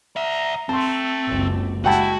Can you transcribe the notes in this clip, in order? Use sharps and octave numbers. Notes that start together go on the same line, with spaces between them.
D5 E5 A#5
A3 C4 A5 C6
F#1 C#2
G#3 E4 F#4 F#5 G5 A5